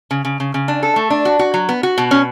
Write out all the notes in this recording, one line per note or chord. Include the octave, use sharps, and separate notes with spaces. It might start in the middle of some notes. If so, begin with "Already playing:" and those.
C#3
C#3
C#3
C#3
D4
A4
A3
D4
F#4
F#4
F#3
B3
F#4
B2
C#4